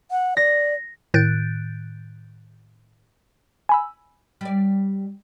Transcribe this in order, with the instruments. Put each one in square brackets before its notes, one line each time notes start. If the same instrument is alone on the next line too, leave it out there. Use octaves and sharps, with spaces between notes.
[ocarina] F#5
[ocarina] D5 [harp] A#6
[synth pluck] A2 D#3 F#6 G6 A6 D7
[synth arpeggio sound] G#5 B5 E6
[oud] G3 D5